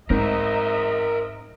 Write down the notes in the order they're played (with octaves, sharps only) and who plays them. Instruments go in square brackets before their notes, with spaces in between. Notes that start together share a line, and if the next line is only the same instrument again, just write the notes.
[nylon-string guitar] G#2 C4 [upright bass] D#4 [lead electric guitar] A#4 C5 [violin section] D#5 E5 A#5